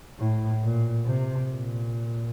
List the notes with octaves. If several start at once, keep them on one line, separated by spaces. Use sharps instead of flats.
A2
A#2
C3
A#2